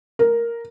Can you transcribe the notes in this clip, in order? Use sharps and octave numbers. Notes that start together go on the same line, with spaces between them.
A#4